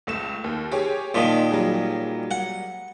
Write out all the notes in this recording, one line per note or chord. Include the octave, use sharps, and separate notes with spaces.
C#2 A3 E7
D#2
G4 G#4 C#5
A#2 D#3 D#5 A5 C6
F#3 G3 G#4
F#5